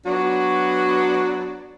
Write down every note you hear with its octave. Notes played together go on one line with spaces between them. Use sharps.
F#3 B3 D4 F#4